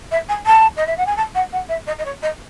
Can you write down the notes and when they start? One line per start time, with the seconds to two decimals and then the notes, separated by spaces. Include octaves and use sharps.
0.11 E5
0.29 G#5
0.46 A5
0.77 D#5
0.87 E5
0.97 F#5
1.06 G#5
1.17 A5
1.35 F#5
1.52 F#5
1.69 E5
1.87 D#5
1.99 D#5
2.05 C#5
2.22 D#5